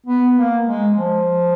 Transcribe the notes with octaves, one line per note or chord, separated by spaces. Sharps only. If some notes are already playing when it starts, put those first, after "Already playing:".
B3
A#3
G#3
F3